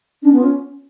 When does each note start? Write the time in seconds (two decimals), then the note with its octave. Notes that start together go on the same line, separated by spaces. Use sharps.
0.22 C#4 D4
0.32 B3
0.35 F4
0.43 C#4